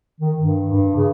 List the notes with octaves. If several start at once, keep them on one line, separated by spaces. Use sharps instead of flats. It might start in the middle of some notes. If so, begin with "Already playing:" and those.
D#3
G2
G2
C#3